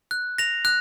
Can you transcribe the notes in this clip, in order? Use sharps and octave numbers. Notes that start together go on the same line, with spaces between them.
F#6
A#6 F7
F#6